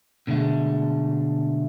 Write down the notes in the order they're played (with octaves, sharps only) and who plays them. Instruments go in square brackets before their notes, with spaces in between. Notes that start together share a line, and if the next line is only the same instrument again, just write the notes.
[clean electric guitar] B2 D3 G#3 A3